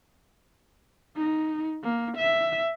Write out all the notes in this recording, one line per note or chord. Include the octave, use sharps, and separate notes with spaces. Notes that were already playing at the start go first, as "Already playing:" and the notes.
D#4
A#3
E5